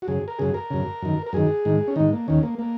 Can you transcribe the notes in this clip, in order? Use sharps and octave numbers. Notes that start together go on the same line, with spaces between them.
F#4
F#2 C#3 G#4
A#4
F#2 C#3 G#4
A#4
F#2 C#3
F#2 D#3
A#4
F#2 D#3 G#4
G#2 D#3
C#4
G#2 D#3 D#4
A#3
D#2 D#3 C#4
A#3
A#3